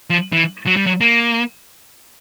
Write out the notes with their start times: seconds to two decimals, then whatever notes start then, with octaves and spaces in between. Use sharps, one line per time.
0.10 F3
0.32 E3
0.66 F#3
0.77 G3
0.86 F#3
1.01 A#3